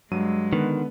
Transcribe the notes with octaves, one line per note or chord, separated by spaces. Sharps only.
G2 F#3 G#3 D#7
D3 D#3 B3 B4